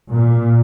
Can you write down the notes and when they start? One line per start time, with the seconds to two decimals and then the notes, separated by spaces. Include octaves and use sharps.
0.12 A#2